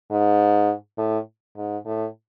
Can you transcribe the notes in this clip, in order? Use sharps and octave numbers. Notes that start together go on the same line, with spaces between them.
G#2
A2
G#2
A2